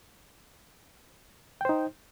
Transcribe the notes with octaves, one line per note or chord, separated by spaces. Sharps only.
D#4 C5 G5